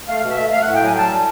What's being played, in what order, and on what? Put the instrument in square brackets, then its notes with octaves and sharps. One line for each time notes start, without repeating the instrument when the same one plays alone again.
[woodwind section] A3 F5
B2
E5
A3
A3 F5
F#5
A2
G5
F#3 G#5
G3 A5
G3